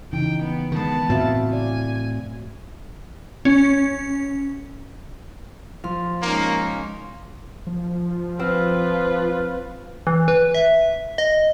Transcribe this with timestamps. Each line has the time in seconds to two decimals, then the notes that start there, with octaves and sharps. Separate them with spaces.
0.13 C#3 E3 D#4 G5
0.43 B3
0.72 D#3 G#3 B3 A5
1.09 A2 C4 F#4 E5 F5
1.53 D5 G#5
3.45 C#4
5.84 F3 F5 C6
6.22 G#3 A#3 C#4 D#4
7.67 F3
8.40 C4 F4 B4 F5
10.07 E3
10.28 B4
10.54 E5
11.18 D#5